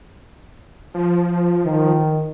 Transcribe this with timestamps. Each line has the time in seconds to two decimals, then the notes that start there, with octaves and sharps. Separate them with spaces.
0.94 F3
1.65 D#3